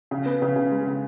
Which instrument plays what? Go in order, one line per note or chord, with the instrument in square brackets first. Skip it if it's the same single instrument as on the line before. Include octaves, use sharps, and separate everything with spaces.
[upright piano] C#3
B3
C#3
C#3
G#3
C#3